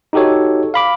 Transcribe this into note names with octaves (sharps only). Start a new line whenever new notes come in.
D#4 F#4 G4 A4 C#5
F5 B5 D6